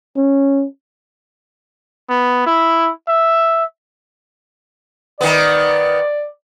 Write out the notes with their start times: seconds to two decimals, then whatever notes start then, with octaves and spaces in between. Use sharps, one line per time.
0.17 C#4
2.09 B3
2.46 E4
3.08 E5
5.21 D#3 B3 D5